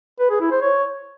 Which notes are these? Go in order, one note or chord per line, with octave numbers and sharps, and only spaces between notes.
B4
G#4
E4
C5
C#5